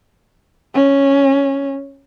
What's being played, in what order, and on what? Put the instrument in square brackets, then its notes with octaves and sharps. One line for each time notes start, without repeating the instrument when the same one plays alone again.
[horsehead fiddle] C#4